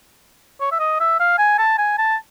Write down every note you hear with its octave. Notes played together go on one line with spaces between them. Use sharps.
C#5
E5
D#5
E5
F5
G#5
A5
G#5
A5